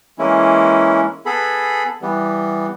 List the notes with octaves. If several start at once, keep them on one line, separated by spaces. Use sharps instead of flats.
E3 G#3 A#3 C#4 E4
B3 G#4 A4 B5
E3 G3 B3